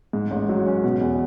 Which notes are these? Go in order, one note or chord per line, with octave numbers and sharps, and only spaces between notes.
G#2
A1
F#3
C#4
B2
E2